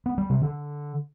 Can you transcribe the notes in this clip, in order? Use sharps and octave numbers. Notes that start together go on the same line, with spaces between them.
B3
G3
C3
D3